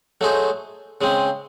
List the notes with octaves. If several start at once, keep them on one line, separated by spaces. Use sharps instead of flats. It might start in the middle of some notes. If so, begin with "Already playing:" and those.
F#3 A3 D#4 G#4 C5
C#3 G#3 C4